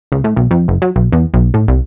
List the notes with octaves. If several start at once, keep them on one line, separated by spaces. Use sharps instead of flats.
C#2
A2
B1
F2
F#1
F#3
B1
E2
B1
A2
C2